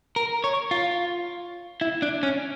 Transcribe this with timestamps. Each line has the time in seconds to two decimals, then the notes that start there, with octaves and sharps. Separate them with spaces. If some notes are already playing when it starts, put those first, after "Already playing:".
0.16 A#4
0.44 C#5
0.71 F4
1.81 E4
2.02 D4
2.23 C#4